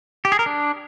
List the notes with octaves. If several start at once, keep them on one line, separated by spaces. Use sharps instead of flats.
G4
G#4
A#4
D4